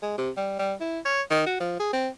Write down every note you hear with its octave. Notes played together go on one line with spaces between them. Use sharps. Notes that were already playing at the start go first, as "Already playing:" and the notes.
G#3
C3
G3
G3
E4
C#5
D#3
F#4
F3
G#4
C4